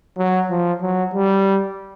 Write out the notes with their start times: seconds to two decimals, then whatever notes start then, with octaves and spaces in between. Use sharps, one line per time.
0.18 F#3
0.50 F3
0.82 F#3
1.14 G3